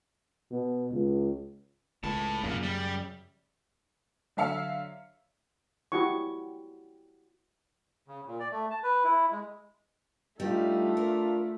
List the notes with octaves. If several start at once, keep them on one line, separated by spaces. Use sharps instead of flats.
B2
C#2
C#2 A2 A5
F#2 A#2 C#3 A#3
G3
D3 F#3 E5 F5 E6 C#7
E4 F#4 G4 C#6
C#3
A#2
D5
A3
A5
B4
E4
G#3
G3 A3 D4 D#4 F4
A#4